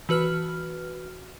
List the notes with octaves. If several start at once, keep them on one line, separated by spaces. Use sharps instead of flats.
E3 F#4 B4 F6